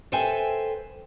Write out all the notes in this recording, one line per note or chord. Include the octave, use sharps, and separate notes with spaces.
A4 B4 C5 E5 G5 G#5